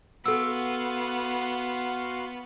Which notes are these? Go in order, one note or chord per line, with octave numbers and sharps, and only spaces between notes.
B3 F#4 A4 F5 C6 E6